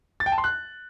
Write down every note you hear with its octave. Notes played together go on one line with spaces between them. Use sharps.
A6
G5
A5
C6
F#6